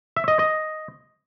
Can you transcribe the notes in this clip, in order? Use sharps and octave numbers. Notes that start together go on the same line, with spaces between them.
E5
D#5
D#5